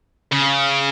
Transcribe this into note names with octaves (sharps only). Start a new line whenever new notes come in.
C#3